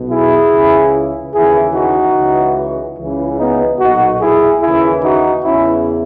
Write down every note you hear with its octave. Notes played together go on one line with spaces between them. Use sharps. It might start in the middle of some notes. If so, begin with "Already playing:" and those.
Already playing: B1 B2
E4 G#4
C#2 C#3 E3
D#2 C#3 E3 E4 G#4
D#4 F#4
C#2 C#3 E3
C#2 C#3 E3
B3 D#4
B1 A#2 D#4 F#4
E4 G#4
D#2 C#3 E3 E4 G#4
D#4 F#4
E2 C#3 E3 C#4 E4